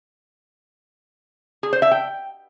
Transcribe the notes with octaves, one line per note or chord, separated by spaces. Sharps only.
G#4
C5
E5
G5